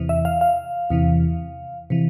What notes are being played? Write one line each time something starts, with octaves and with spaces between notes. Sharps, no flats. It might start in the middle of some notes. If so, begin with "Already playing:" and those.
Already playing: E2 C3 E3
E5
F5
F5
E2 C3 E3
C3 E3